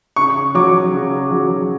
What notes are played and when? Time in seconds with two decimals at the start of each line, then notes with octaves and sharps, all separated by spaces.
0.16 C#3 C#6
0.55 F#3 D6
0.94 C#3
1.31 F#3